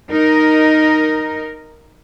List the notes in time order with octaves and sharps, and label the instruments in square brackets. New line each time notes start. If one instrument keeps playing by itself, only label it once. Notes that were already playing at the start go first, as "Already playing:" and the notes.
[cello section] D#4 A#4